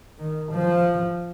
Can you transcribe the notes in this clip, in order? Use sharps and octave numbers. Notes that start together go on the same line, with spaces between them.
D#3
F3